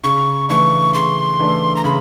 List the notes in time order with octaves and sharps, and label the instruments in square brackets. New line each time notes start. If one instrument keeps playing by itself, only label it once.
[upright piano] C#3 [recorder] C#6
[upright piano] E3 A3 D4 [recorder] C#6
[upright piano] C#3 [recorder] C6
[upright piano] E3 A3 D4
[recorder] A#5
[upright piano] C#3 [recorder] B5